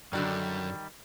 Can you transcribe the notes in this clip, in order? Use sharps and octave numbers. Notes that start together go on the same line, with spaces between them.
F#2 D3 D#3 G3 F#4 D5